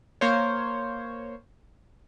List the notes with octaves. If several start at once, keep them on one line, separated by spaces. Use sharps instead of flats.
A#3 C5 C#5